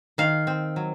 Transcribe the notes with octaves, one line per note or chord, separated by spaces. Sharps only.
D#3 F5
C4
F#3